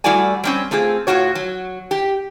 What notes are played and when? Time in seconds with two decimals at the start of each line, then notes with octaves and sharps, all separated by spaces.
0.04 G3 A3 E4 F#4 D5 G#5
0.44 G3 C4 C#4
0.71 A3 C4 F4 G#4
1.07 A2 G3 F4 F#4 C#5
1.35 F#3
1.91 G4